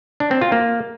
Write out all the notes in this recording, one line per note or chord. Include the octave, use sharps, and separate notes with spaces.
D4
C4
F4
A#3